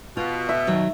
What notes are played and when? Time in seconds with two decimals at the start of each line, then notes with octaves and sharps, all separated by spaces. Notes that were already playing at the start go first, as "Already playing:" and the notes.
0.17 B2 F4
0.49 E5
0.67 D#3 F#3